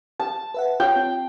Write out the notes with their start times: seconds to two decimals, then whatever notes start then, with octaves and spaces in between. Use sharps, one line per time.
0.20 A5
0.54 B4 E5 F#5
0.80 F4 C#5 F#5 G5
0.96 C4